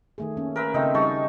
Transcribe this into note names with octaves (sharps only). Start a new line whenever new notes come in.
D#3 A3 G#4
A#3 C#4
A#4 B4 E5
C#3 A3 C4 D#4
G3 D#4 G#4 A5 C#6